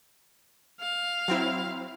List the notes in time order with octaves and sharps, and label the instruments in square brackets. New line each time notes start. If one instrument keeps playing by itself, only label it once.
[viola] F5
[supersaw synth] F#3 C4 E4